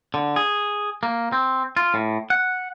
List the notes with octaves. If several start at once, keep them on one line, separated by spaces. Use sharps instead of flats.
D3
G#4
A#3
C4
F4
A2
F#5